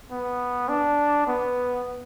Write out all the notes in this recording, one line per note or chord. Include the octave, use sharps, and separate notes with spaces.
B3
D4
B3